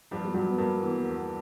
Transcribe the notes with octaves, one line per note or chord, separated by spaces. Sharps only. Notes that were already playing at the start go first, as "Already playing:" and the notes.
G2 F3
G3
G2 F#3
B3
G2 A#3
A#3
E3 B3
A#3
E2
B3